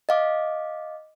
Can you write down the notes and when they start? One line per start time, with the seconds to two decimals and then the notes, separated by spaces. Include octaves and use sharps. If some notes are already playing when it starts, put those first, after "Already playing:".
0.09 D#5 F5 D6